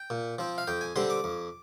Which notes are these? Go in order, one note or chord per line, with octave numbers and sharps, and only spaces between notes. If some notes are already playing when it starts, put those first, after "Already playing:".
Already playing: G5
A#2
F3 C4
F5
F2 G5
G#5
D3 G3 C4 C6
D6
F2